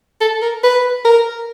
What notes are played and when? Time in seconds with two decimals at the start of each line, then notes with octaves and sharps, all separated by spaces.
0.21 A4
0.42 A#4
0.63 B4
1.05 A#4